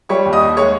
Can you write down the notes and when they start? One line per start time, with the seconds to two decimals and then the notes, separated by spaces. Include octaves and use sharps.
0.09 G3 C#5 C#6
0.25 D#2
0.33 D#5 D#6
0.41 D#2
0.56 G#3 C#5 C#6